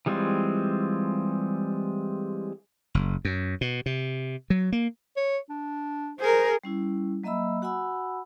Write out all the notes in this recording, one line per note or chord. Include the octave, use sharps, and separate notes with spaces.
E3 G3 G#3 C4 F4
F#1
F#2
B2
C3
F#3
A#3
C#5
D4
G#4 A#4 C5
G3 C#4 E4
F#3 A#3 D#5 E5 B5 E6
F#4 F#5 G#5 B5 E6